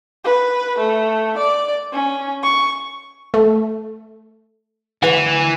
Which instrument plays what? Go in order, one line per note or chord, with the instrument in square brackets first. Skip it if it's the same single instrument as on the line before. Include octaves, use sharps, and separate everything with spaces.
[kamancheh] B4
A3
D5
C#4
C#6
[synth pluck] A3
[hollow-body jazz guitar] D2 B4 F#5 [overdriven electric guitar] E3